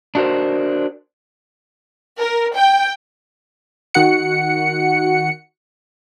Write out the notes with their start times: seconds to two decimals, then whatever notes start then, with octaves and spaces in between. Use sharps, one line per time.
0.15 D4 F#4 A#4 C5
2.20 A#4
2.56 G5
3.94 D#3 F#4 F#5 C#7